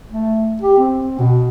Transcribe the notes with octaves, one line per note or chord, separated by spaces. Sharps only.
A3
G4
C4
B2